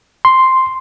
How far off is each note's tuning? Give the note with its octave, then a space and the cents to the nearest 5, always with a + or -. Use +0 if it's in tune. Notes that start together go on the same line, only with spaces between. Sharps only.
C6 +0